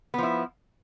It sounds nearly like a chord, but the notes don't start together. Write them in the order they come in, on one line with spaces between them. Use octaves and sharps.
B3 F3 E4